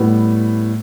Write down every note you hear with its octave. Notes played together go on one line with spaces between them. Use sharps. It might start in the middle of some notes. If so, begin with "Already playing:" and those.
Already playing: A2 G3 B3